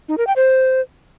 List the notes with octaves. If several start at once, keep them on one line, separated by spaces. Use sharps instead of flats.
D#4
A#4
G5
C5